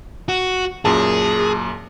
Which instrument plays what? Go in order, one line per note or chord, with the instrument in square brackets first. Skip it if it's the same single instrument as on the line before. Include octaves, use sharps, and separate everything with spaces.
[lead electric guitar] F#4
[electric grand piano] F#2 A#2 A5 [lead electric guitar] G#4